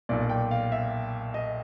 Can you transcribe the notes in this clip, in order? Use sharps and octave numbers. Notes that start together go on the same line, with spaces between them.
B1 A#2 D5
G5
F5
E5
D#5